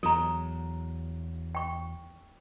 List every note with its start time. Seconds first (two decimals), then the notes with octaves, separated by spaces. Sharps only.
0.03 E2 F#3 A4 A#5
1.55 G5 C#6